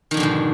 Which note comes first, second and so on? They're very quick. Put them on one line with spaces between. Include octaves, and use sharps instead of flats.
D#3 F2 D3 B2 G#2